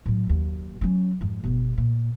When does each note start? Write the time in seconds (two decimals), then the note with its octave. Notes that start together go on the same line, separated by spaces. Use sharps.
0.06 A2 F#3
0.27 F#1 D#2
0.81 F#3 C#4
1.21 F2 G#2
1.44 G1 B2
1.78 A#2